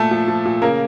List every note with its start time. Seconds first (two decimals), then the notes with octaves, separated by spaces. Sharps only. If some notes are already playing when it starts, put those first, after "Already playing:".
Already playing: A#2 A3 A4
0.11 F3
0.28 F3
0.45 A#2
0.62 C#3 A#3 A#4